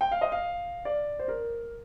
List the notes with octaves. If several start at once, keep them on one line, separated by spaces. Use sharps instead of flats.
G5
F5
D#5
F5
D5
C5
A#4